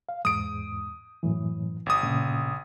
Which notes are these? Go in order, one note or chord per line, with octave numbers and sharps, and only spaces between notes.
F5
E2 G#2 D#6 D7
F#2 A2 E3
G1 D#6
A#2 C#3